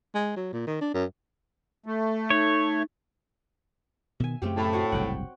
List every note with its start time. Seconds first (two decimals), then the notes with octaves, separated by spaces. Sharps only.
0.14 G#3
0.36 F#3
0.53 A#2
0.67 D#3
0.81 D4
0.94 F#2
1.86 A3
2.30 D#4 C#5
4.20 B2 D3 D#3 E5 G#5
4.42 F#2 C#3 A3 C4 G4
4.56 A2
4.73 C4 F#4 C#5
4.92 F#1 C2 G#2 F#5 G5